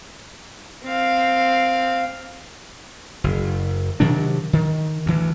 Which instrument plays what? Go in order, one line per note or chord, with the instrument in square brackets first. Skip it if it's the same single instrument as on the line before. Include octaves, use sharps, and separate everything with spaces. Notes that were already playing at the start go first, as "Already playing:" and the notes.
[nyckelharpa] C4 F5
[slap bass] F#1
C3 D#3 F#3 D4
D#3
D2 E3